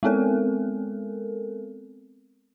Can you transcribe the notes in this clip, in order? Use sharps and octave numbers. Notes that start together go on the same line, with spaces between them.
G#3 B3 C4 A4 A#4